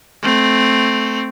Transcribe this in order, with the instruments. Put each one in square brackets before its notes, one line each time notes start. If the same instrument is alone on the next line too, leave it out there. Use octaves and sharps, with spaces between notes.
[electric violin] A3 C4